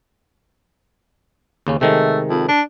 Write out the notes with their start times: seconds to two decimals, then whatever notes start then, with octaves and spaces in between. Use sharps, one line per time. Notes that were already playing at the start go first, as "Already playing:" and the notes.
1.67 D#2 C#3 C#4
1.81 C3 D#3 G#3 A3
2.30 F2
2.48 D4